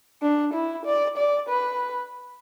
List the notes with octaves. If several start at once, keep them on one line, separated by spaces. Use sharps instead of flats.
D4
E4
D5
D5
B4